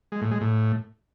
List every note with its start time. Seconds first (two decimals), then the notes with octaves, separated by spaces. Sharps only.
0.12 G#3
0.22 A2
0.31 G#3
0.41 A2